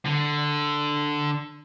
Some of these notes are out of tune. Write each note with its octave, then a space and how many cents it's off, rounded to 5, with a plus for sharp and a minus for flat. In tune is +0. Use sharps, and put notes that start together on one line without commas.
D3 +5